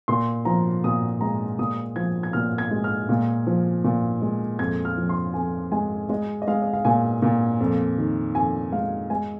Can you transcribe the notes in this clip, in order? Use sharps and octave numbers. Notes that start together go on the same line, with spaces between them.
A#2 C6
F3 A#5
A#2 D#6
G#3 A#5
A#2 D#6
F3 G#6
G#6
A#2 F6
G#6
G#3
F6
A#2
F3
A#2
G#3
F2 G#6
F6
F3
C6
F2 G#5
G#3 G#5
G#3 D#5
D#5
G#3 F5
D#5
F5
A#2 G#5
A#2
F2
D#3
F2 G#5
G#3 F5
G#3 G#5